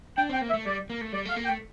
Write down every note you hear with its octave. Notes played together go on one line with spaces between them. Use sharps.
D4 G5
C4 G5
A#3
E5
A3
G3 D5
A#3
A3
G3 D5
A3 F5
A#3
G5
A3